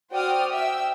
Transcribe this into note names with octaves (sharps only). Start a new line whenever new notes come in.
F#4 C5 D5 G5 D#6 F6
E5 G5 E6